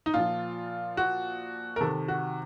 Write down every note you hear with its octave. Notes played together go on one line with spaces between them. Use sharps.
D#4
A#2 F3 F4
F#4
A#4
C3 D#3 A4
F#4